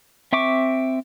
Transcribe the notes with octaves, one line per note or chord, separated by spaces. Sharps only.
C4 E5 C#6 D6